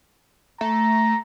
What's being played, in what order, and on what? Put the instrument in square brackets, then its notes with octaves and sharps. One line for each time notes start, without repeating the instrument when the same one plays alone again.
[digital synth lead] A3 [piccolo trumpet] A#5